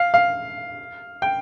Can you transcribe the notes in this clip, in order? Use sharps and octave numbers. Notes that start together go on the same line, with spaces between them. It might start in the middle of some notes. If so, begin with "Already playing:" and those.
Already playing: F5
F5
G5